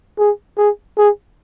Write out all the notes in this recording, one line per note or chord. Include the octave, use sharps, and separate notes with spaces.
G#4
G#4
G#4